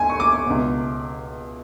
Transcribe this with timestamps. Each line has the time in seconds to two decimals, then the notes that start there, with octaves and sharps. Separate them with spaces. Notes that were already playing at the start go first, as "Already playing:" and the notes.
Already playing: D2 G#5
0.10 C#6
0.20 D6
0.47 C#2 B2